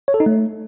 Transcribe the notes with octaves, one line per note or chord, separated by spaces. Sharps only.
C#5
A4
D#4
A3